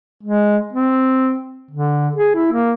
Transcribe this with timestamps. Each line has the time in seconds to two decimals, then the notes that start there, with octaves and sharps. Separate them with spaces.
0.23 G#3
0.73 C4
1.71 D3
2.16 G#4
2.35 E4
2.52 A#3